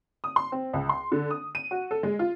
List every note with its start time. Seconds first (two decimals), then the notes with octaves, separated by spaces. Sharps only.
0.24 D#6
0.36 C6
0.52 C4
0.74 C#2
0.89 C6
1.12 D3
1.30 D#6
1.55 D#7
1.71 F#4
1.91 A4
2.03 G#3
2.19 F4